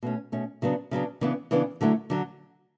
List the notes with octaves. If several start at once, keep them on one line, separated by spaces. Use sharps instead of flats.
B2 A3 C#4
B2 A3 C#4
C#3 F#3 B3 D4
C#3 F#3 B3 D4
C#3 E3 B3 D4
C#3 E3 B3 D4
D3 F#3 A3 E4
D3 F#3